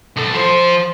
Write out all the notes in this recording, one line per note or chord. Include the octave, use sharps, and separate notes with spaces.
B1 A4
F3 C5